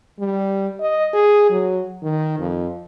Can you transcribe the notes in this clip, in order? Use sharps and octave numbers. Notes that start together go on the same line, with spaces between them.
G3
D#5
G#4
F#3
D#3
F2